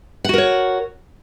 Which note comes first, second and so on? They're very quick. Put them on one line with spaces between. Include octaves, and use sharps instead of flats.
F#5 F#4 A#4 C#5